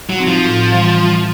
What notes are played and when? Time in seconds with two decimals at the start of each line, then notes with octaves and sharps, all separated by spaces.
0.10 F#3
0.19 C4 D#4
0.28 F3
0.45 A2
0.72 E3 G3
0.98 G3